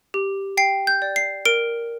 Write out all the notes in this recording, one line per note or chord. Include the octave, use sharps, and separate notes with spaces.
G4
G5 C7
G6
D5
C7
A#4 D7